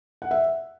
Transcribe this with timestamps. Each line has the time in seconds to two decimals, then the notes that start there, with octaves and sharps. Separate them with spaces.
0.22 F#5
0.31 E5